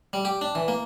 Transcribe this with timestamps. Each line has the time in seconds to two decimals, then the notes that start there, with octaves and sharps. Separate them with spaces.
0.13 G3
0.25 G4
0.41 D4
0.55 E3
0.68 A#3